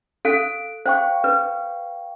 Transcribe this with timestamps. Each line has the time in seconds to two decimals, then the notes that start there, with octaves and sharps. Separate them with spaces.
0.25 A4 F5 F#6 D7
0.86 C5 F5 G5 C#6
1.24 B4